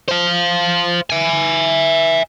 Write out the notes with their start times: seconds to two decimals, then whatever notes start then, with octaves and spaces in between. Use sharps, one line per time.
0.09 C5 F5
1.10 E5 G#5